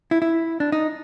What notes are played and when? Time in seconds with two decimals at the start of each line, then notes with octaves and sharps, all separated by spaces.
0.11 E4
0.22 E4
0.60 D4
0.72 D#4